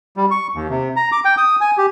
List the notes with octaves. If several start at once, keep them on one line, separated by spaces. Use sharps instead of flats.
G3
C#6
D#2
C3
A#5
D6
G5
D#6
G#5
G4